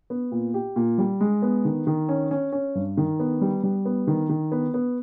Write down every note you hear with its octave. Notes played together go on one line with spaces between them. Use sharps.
B3
A#2
G4
A#2
G3
G#3
B3
D#3
D#3
C#4
C#4
C#4
G2
D#3
B3
G3
G3
B3
D#3
D#3
B3
B3